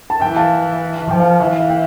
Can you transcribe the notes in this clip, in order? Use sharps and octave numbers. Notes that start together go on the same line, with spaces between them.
A5
E3 G5
F5 A5
F3 G5
F5
E3 F5
F5
G5